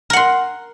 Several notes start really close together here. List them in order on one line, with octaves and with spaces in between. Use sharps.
A#4 F#5 C6